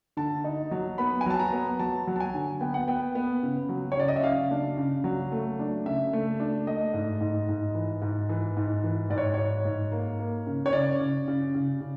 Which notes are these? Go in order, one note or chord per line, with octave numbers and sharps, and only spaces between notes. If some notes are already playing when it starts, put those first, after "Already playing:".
D3 A5
D#4
F#3
B3 B5
G#5
F#3 A5
A#5
B3
F#3 A5
F#3
A5
G#5
D3
B3 G5
F#5
B3 G5
B3
C#3
F#3
C#5
C#3 D5
D#5
E5
C#3 F5
D4
C#3
F#3
A3
D4
C#3 E5
A3
D4
A3 D#5
G#2
G#2
G#2
E3
G#2
E3
G#2
E3
G#2 D5
C#5
G#2 C#5
G#2
A#3
A#3
C#3
C#5
C#3 D5
C#3
C#3
C#3
C#3